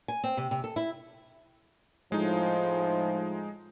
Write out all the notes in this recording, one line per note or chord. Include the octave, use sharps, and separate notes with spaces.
G#5
C4
C3
C3
A4
E4
A2 F3 G#3 D#4